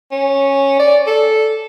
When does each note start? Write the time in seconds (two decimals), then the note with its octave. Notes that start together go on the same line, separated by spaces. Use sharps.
0.11 C#4
0.79 D5
1.07 A4